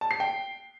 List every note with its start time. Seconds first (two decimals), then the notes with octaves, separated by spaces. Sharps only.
0.01 A5
0.11 C7
0.20 G5